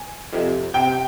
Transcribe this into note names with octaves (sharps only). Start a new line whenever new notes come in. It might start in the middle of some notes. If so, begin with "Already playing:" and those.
Already playing: G#5
F2 C3
C3 G5